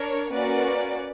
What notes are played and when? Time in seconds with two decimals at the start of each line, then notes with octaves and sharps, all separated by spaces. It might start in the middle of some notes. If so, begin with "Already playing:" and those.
Already playing: D4 A#4 C#5
0.31 A#3 C#4 F#4 B4 D5